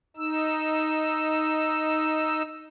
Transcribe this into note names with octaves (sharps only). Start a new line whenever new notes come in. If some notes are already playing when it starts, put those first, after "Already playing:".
D#4 E6